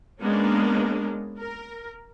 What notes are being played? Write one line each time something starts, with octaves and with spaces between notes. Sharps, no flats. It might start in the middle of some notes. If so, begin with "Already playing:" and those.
G#3 A#3 B3 C#4 D4 A#4
A#4